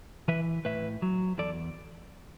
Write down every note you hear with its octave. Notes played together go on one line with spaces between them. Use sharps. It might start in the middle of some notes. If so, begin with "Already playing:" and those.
E3 B4 E5
A2 B4 E5
F#3
E2 A4 D5